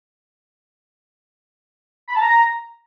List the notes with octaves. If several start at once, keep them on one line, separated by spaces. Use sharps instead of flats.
B5
A5
A#5